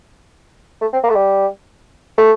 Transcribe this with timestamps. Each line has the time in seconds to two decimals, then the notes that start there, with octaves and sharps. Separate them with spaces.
0.81 A3
0.93 C4
1.04 A#3
1.10 A3
1.16 G3
2.18 A3